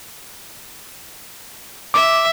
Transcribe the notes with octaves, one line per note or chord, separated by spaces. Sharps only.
E5 D6